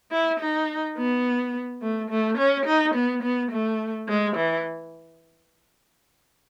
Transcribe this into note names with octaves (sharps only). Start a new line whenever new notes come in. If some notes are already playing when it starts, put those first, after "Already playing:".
E4
D#4
B3
A3
A3
C#4
D#4
B3
B3
A3
G#3
E3